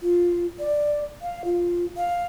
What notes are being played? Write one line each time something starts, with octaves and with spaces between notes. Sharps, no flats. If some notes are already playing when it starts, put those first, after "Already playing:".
F4
D5
F5
F4
F5